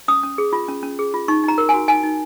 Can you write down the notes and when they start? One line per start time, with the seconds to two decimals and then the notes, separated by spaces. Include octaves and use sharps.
0.08 C#4 D#6
0.23 C#4
0.38 G#4
0.53 F4
0.68 C#4
0.83 C#4
0.99 G#4
1.14 F4
1.28 D#4 C#6
1.44 D#4 A#5
1.58 A#4
1.69 G#5
1.74 F#4
1.88 D#4 G#5
2.03 D#4